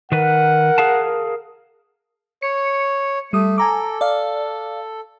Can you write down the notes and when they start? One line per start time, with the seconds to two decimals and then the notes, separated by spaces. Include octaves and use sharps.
0.12 D#3 A#4 B4 F#5
0.78 G#4 F5 A5
2.42 C#5 C#7
3.33 G3 A3 D#6
3.58 A4 G#5 A#5 D6
4.01 D5 F5